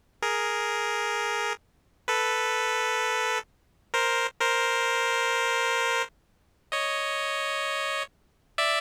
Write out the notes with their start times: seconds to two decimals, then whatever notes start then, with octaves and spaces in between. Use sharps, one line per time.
0.22 G#4 A#4
2.08 A4 B4
3.94 A#4 C5
4.40 A#4 C5
6.72 C#5 D#5
8.58 D5 E5